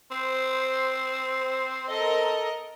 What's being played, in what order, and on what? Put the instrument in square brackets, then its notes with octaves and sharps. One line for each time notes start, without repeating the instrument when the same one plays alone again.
[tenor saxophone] C4 [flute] C5
[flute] A4 [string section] A#4 D#5